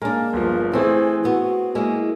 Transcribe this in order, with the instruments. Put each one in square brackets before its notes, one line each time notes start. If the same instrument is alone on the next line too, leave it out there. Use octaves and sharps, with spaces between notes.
[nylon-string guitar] G#3 D4 [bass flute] A#3 [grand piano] A#4
[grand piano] G1 F3
[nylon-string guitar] E3 A3 [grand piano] C4 G#4 [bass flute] C5
[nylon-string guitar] B3 [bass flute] F#4
[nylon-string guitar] G#3 A#3 E4